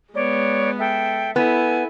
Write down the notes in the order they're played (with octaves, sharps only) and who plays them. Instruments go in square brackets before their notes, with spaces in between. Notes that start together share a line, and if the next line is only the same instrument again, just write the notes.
[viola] G#3 B3 [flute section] C#5 D5
[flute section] A4 E5 G5
[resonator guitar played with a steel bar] B3 [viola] E4 A4 [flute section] G#5